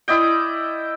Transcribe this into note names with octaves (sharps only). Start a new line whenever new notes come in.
E4 D5 D#5 G5